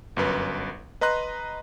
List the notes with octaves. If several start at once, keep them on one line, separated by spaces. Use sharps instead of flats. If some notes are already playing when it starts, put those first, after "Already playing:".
G1 F#2 B4
B4 D#5 A#5 C6 F#6